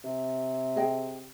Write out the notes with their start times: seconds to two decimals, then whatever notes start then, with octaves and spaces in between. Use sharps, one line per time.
0.04 C3
0.76 G#4 D#5 G5